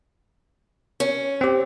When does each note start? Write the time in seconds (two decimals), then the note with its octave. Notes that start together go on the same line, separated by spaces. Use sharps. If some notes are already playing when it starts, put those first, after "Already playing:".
1.00 C#4
1.41 C4 G4